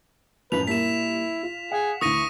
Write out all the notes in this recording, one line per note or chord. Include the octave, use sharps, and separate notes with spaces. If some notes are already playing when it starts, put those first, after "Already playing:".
A1 F#2 F3 B4 F7
A#2 G3 A#3 E4 B6 E7
F4
G#4 F5 F#5
D2 E3 C#6 D#6 A#6 D#7